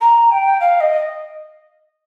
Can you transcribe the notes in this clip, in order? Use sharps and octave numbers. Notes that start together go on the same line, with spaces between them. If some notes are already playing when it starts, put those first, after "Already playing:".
A#5
G5
F5
D#5